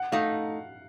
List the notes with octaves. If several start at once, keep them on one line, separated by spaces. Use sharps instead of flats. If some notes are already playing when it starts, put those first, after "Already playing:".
Already playing: F#5
A3 D#4 F5